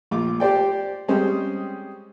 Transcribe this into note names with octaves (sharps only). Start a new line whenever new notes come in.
A#1 F4 D6
G4 C5 D5 G5
G3 G#3 C4 C#4 G#4 C5